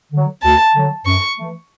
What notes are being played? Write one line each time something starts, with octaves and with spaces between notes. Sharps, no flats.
D3 F#3
D2 A5
D3 F#3
F#2 C#6
E3 A3